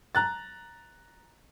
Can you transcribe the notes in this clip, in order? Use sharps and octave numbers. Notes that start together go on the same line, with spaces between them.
A#5 F#6 A6